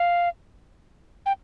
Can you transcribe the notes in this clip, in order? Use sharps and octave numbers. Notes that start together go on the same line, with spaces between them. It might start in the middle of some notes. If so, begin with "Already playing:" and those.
Already playing: F5
G5